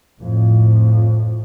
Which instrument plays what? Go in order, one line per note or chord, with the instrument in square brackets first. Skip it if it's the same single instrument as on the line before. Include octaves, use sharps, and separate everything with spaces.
[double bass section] F2 A2